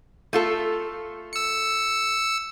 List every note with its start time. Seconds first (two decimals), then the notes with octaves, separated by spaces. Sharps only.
0.33 A3 F4 A4
1.33 E6 C#7